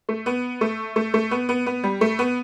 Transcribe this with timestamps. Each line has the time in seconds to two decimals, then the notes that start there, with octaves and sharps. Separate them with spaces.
0.09 A3
0.26 B3
0.61 A3
0.96 A3
1.14 A3
1.31 B3
1.49 B3
1.66 B3
1.84 G3
2.01 A3
2.19 B3